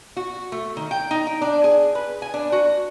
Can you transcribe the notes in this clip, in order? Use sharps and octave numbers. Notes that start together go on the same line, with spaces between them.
F#4
A3
D#3
G5
D#4
G5
D4
G#4
B4
G#5
D4
F#4